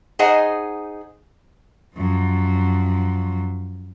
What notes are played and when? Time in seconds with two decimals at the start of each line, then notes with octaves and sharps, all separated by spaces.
0.19 D#4 G#4 C5 D#5 F#5 G#5
1.94 F#2 F3